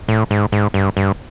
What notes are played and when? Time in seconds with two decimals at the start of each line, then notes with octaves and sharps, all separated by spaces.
0.08 A2
0.31 G#2
0.52 G#2
0.74 G2
0.97 G2